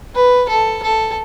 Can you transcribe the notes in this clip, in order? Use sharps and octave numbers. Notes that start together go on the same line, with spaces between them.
B4
A4
A4